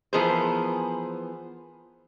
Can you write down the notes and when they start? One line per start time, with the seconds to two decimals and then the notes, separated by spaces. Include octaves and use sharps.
0.13 E3 F3 B3 G#4 A#4 C5